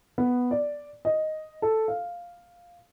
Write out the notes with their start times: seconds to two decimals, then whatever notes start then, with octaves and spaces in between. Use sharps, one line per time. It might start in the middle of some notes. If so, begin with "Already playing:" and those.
0.18 B3
0.51 D5
1.05 D#5
1.62 A4
1.88 F5